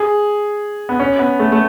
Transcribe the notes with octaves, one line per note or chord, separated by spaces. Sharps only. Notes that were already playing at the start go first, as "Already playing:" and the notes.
Already playing: G#4
B3
C#4
B3
A3
A3